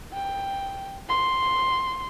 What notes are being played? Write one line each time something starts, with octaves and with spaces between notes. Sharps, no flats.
G5
C6